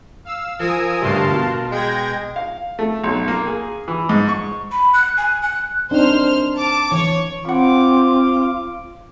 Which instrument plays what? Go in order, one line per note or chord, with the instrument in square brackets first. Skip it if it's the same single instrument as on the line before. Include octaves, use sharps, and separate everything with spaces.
[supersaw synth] F5 E6
[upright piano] F3 [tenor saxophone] A#4 [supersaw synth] G#5 D#6 E6
[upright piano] G1 D2 G3 [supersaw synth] F5 A5 C6
[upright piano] B2
[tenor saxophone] G#3 [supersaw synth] G5 G#6 A#6
[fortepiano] F5
A3
B1
A#3
G#4
E3
G#2
C#6
[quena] B5
F#6
G#5
F#6
[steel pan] C4 D4 D#4 [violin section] C5 F6
[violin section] A5 D6
[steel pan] E3 [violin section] C#5
[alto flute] C4 [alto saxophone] F4 [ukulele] F#5 B5 [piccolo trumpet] D6